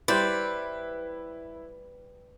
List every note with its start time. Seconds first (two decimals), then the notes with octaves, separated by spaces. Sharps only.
0.08 G3 E4 B4 C5 D5